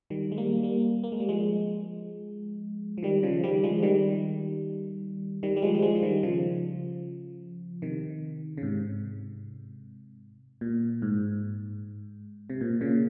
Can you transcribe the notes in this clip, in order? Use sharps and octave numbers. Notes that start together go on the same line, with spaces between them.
D#3 G3
G#3
G3 A#3
G3 A#3
A#3
G#3
G3
F3 G#3
F3
D#3 G3
C#3 F3
D#3 G3
F3 G#3
D#3 G3
D#3 G3
G3
F3 G#3
G3
F3 G#3
F3
D#3 G3
C#3 F3
C3 D#3
C#3
G#2 C3
A#2
G#2
C3
A#2
A#2 C#3